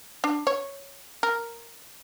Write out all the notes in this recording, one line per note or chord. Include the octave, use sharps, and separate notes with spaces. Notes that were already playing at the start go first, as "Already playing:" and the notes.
D4
C#5
A#4